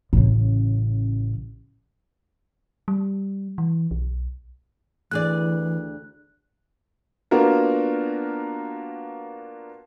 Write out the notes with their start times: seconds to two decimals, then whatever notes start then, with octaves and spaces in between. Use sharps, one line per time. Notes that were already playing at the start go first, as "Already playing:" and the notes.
0.13 A1 C#3
2.88 G3
3.58 E3
3.91 B1
5.11 D2 E3 G#4 D5 F#6
7.31 A#3 B3 D4 F4 F#4 A#4